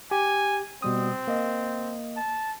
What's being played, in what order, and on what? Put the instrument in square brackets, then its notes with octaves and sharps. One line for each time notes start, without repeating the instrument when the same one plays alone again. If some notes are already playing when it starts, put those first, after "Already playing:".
[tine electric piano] G4 [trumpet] G#5
[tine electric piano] B2 G3 D#6 [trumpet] C4
[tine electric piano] A#3 D#5
[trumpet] A5